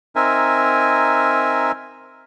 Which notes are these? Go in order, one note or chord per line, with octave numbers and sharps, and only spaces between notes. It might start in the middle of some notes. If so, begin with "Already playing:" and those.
C4 D#4 A#4 E5 G#5